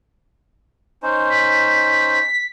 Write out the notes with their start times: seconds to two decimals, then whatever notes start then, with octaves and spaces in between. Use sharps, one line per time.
1.03 C#4 D#4 C5
1.30 B6